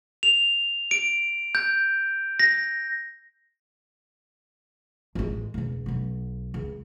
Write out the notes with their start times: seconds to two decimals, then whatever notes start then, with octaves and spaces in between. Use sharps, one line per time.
0.23 F7
0.91 D7
1.55 G6
2.40 A#6
5.15 A1 G#3
5.54 E1 C#2
5.86 B1 B3
6.54 C#2